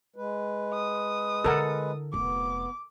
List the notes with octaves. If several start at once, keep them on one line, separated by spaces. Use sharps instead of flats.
G#3 B4
D#6
D3 E4 A4 A#4 F#5
F1 B3 D6